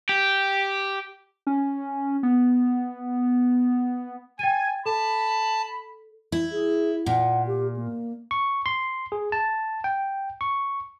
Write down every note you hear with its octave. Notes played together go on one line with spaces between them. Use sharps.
G4
C#4
B3
G5 G#5 A6 D#7
A4 A5 B5
E4
G#4
A#2 F#5
G4
A#3
C#6
C6
G#4
A5
G5
C#6